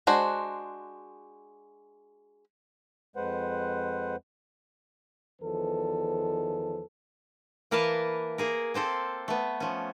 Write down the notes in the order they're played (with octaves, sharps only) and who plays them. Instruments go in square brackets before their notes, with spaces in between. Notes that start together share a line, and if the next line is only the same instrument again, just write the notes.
[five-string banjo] G#3 D4 F#4 C5
[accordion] F2 G#3 B4 C5 F#5
[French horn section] E2 D#3 F3 A4 B4
[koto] E3 A#3 A#4 B4 F5 A5
A#3 G#4 A#4
A#3 C4 A4 C5
A3 B3
F3 C#4